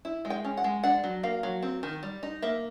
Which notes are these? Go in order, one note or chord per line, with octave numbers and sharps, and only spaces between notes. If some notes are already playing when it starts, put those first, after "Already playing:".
E4
G#3
G5
C#4
F#5
G#3
D4 F#5
F#3
A#3 F5
F#3
C4
D#3
G3
D#4
A#3 E5